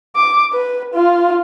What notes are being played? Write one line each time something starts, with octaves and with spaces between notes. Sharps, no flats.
D6
B4
F4